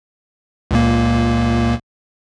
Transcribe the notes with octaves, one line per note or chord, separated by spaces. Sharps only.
C#2 A#2 A#3